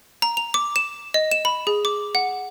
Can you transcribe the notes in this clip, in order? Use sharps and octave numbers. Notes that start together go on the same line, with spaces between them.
A#5
F7
D6
E7
D#5
E7
B5
G#4
D6
F#5